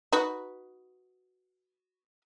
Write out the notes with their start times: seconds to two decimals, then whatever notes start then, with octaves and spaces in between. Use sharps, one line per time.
0.12 D#4 F#4 B4